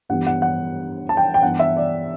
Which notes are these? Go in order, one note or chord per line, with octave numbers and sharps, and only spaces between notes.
G2 E3 G3 B3 F#5
F#5
F#5
A5
G5
G5
G2 E3 B3 F#5
E5
D5